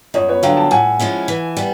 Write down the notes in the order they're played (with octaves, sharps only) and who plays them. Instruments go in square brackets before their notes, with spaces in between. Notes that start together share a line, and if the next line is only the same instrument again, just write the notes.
[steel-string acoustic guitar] F#2 [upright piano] C#5 D#5
[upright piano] B4 C#5
[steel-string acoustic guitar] D3 F#3 [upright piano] F5 G5
[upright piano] G5 A5
[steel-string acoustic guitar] A2 [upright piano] F#5 G#5
[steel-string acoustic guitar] F3 G#3 C#4 E4
E3
G3 B3